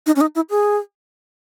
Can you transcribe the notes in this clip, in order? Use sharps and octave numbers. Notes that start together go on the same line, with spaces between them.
D#4
C#4
D#4
E4
G#4